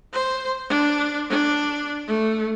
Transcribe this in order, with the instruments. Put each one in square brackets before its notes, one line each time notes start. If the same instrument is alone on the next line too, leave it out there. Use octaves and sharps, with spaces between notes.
[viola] C5
D4
D4
A3